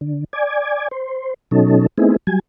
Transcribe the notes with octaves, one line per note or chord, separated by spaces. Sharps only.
D3
D5 G#5
C5
B2 F#3 C#4 D#4 A4
A3 B3 C4 D#4 E4 G#4
F#3 G3 G#5